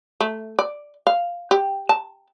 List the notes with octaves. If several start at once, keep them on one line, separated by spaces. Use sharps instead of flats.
A3
D5
F5
G4
A5